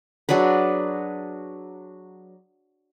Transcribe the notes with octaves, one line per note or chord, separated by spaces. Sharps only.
F#3 D4 G#4 B4